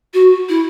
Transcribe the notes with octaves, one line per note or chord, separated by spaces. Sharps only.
F#4
E4